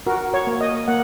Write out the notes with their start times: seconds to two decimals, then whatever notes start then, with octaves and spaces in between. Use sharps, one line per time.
0.07 F#4 A#4
0.34 C#5
0.47 A#3
0.61 D#5
0.88 A#3 F#5